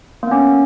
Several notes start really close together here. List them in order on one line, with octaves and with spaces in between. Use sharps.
A#3 B3 C#4